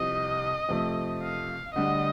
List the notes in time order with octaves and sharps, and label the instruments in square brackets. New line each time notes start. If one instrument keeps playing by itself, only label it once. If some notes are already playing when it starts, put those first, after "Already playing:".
Already playing: [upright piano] C2 C3 F3 [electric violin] D#5
[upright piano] F2 C3 F3 A3
[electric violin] F5
[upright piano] D2 D3 G3 [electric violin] D#5